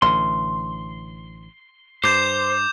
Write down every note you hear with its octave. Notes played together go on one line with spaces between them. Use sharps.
A1 D3 C6
G2 C5 D6 G6 E7